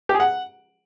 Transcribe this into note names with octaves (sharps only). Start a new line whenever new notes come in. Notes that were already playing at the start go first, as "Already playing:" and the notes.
G4
G#4
F#5